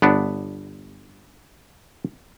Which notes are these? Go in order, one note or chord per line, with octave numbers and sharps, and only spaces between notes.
G1 B3 D4